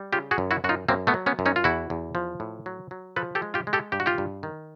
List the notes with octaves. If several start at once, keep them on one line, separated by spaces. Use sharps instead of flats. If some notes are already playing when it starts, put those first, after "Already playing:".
Already playing: G3
C#3 F4 G4
F#4 G#4
F#2
E4 F#4
F#2 F#4
D#4 F4
F#2 A#3 C4
A3 B3
F#3
B3 C#4
F#2
C#4 D#4
F4
E2 E4 F#4
E2
F3
A2
F#3
F#3
F3 A4 B4
G4 A4
G#3
F4 G4
G#3
G4 A4
G2 G4
F#4
F4 G4
G2
D#3